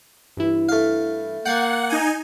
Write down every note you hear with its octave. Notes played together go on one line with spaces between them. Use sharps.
G2 E3 E4
A3 F5
A#3 F#5 G5 G#6 A6 C7
D#4 G#5